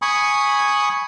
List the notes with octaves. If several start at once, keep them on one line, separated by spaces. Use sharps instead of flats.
G#5 B5 C#6 D#6